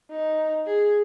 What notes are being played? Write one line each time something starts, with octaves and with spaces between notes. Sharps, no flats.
D#4
G#4